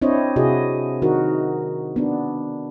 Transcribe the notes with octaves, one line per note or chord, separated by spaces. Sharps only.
C4 D4 E4 C5 C#5 D#5
C3 E4 F#4 G#4 D#5
D#3 D#4 F#4 A#4
B3 D4